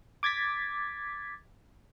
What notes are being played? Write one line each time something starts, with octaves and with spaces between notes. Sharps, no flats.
D6 G#6 A6 B6